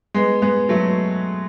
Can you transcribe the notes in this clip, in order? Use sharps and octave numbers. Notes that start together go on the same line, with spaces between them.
G#3 B3
G#3 B3
F#3 A3